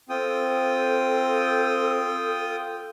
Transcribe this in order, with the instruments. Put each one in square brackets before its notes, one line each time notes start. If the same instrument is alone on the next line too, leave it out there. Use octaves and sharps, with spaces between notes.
[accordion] C4 [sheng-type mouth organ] F4 G5 D#6 [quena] A4